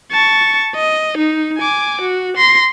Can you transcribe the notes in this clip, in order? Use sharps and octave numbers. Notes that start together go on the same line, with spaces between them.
A5 C#6
D#5
D#4
G#5 D6
F#4
C6 A#6